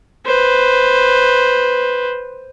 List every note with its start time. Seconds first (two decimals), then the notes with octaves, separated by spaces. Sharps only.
0.26 B4 C5